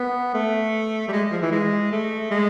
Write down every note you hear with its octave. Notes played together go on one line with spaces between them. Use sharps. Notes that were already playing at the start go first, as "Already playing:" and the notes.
Already playing: B3
A3
G3
G#3
F3
E3
G#3
A3
G#3